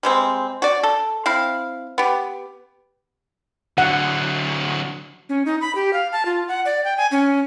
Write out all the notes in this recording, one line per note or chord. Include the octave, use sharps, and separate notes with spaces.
G3 G#3 C4
F#4 D5
A4
C4 E4 F5
B3 G4
D3 F#3 F#5
C#4
D#4
B5
G4
F5
A5
F4
F#5
D5
G5
G#5
C#4